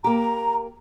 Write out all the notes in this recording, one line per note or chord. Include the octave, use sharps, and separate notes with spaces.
A#3 G4 A#5